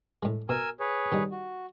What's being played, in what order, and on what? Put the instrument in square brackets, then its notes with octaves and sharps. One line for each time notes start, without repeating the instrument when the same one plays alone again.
[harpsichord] A2 G#3
[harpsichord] B2 [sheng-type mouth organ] A#4 G#5 E6
[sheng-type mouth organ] G#4 B4 C#5
[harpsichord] D#3 G3 D#4
[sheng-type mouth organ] F#4